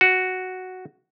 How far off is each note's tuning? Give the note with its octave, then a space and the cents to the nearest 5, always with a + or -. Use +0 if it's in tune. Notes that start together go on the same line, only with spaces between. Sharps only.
F#4 +0